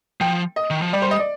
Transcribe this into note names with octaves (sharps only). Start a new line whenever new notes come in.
F3 G5
D#5
D#3
F3
G3 D5
C5
D#5
D5